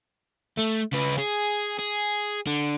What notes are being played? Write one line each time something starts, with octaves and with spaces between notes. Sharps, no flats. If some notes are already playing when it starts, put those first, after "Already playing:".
A3
C#3 B4
G#4
G#4
D3